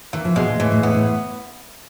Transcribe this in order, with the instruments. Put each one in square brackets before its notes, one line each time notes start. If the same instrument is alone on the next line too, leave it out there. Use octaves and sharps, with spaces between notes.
[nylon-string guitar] D#3 [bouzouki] E3
[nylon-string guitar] F3
[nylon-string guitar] B2 [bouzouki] G#3
[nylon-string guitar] A#2
[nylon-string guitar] A2 [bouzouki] E3
[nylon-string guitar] A2
[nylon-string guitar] A2 [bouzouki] B3
[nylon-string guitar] A2